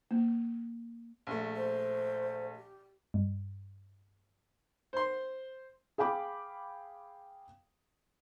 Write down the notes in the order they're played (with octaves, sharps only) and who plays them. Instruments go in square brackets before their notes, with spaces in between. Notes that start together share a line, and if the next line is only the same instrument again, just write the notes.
[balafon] A#3
[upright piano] A#1 A3
[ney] C5
G4
[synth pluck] G2
[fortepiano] C5 C6
[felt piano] G#4 F5 G5 B5 D6